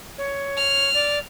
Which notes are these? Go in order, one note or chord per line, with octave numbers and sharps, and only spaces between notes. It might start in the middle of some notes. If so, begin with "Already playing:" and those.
C#5
F6
D5